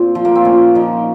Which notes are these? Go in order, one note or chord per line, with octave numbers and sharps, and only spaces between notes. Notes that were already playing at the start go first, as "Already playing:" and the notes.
Already playing: A#2 C4
F3
A#3
C4
A#2 C#4
F3 D#4